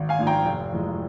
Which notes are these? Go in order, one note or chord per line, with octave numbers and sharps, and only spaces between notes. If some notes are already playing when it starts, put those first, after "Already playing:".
Already playing: G#1
F5 G#5
G#2 F3
G5 A#5
F1
F2 E3 G#3